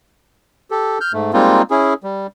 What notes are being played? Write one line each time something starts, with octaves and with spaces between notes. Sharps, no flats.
G4 A4
F6 G6
G#2 A3
G3 G#3 A#3 C4 D#4 F4
C#4 E4 G#4
G3